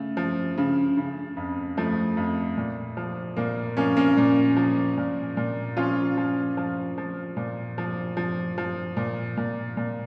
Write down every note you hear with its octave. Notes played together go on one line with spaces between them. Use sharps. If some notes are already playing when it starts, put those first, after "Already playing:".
Already playing: C#3 A3
F3
C#3
C#3
F2
F3 A3
F2
A#2
F3
A#2 A#3
F3 A#3 C#4
A#3 C#4
A#2
F3
A#2
A#2
F3 C#4 F4
F3
F3
F3
A#2
F3
F3
F3
A#2
A#2
A#2